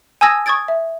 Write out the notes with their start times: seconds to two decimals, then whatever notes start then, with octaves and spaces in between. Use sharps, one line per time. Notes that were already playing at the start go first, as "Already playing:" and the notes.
0.21 G#5 A5 D#6 E6 G#6 A#6
0.46 C#6 D#6 G#6 A6 D7
0.68 E5